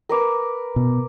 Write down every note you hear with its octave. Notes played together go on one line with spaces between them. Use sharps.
A#4 B4 D6
B2